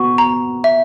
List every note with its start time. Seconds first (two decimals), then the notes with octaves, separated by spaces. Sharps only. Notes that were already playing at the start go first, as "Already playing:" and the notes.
Already playing: B3 F#4 C#6
0.18 A#5
0.64 E5